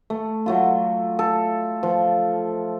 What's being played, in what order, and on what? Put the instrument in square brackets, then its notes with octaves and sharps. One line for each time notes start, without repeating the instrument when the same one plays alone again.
[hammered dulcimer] A3
F#3 A3 F4
A4
F3